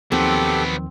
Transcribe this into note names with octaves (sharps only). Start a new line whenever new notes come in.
D#2 D#3 F3 F#3 B3 C4 G4 A4